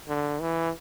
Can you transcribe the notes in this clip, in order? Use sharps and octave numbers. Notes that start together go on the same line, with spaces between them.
D3
E3